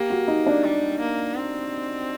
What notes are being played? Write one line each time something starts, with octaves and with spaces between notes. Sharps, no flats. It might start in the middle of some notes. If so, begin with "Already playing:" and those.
Already playing: A#3 G4
F#4
D#4
D4
G3
A#3
C4